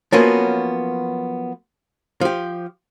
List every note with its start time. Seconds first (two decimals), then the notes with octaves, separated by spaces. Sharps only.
0.12 F3 F#3 A#3 B3 C#4
2.21 F3 G4